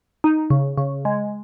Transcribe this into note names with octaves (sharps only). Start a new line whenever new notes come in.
D#4
C#3
C#3
G#3